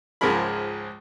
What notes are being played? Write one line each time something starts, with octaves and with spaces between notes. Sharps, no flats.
C#2 G#2 F3 G#3 A#4 B5